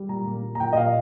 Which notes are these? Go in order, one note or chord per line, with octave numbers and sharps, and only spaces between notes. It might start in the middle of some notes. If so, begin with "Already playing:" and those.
Already playing: G3
A#2 A#5
A#3
A#3
A#5
A#2 G5
D#5
A#2 F5